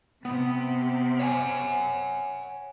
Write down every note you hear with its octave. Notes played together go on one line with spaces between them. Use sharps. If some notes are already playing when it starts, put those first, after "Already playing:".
C3 B3
C#5 F#5 G#5